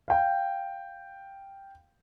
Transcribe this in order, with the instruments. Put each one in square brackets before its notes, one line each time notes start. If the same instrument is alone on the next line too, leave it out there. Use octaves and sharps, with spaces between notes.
[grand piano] F5 G5